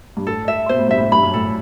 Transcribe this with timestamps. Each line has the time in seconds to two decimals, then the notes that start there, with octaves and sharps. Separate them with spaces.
0.17 G2
0.27 A2 A4
0.48 E5
0.69 B2 C5
0.79 A2
0.88 G2 E5
0.97 A2
1.12 G2 B5
1.23 F#2
1.34 A2 A4